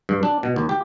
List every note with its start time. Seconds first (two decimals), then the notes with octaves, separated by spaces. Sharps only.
0.09 G2
0.23 D4
0.43 B2
0.56 D#2
0.69 G4